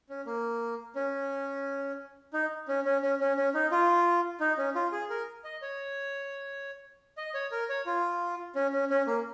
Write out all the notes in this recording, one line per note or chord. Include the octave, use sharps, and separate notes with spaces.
C#4
A#3
C#4
D#4
C#4
C#4
C#4
C#4
C#4
D#4
F4
D#4
C#4
F4
G#4
A#4
D#5
C#5
D#5
C#5
A#4
C#5
F4
C#4
C#4
C#4
A#3